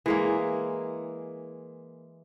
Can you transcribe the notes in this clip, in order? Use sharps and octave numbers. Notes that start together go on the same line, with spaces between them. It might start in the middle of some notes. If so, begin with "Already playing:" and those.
E3 G#3 A#3